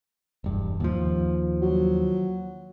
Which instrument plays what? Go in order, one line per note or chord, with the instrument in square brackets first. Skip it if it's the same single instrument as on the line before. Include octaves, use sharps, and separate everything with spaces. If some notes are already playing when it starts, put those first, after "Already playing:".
[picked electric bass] E1 G2
D#2 F3
[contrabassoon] F#3